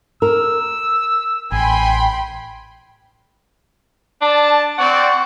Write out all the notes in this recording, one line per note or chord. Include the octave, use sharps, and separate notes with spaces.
A#4 E6
A1 G5 G#5 B5 C6
D4 A5
C4 D5 F#5 C#6